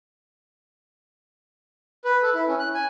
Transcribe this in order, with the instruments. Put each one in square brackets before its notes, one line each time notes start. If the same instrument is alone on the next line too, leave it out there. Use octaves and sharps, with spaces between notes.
[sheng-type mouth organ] B4
A4
E4
C#4
F#6
G#5